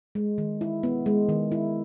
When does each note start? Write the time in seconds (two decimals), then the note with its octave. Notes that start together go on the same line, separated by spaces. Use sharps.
0.15 G#3
0.38 D#3
0.61 E4
0.83 B3
1.06 G#3
1.29 D#3
1.52 E4